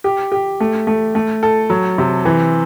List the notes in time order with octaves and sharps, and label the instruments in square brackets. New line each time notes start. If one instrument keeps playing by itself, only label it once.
[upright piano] G4
G4
A3
A3
A3
A4
F#3
C3
E3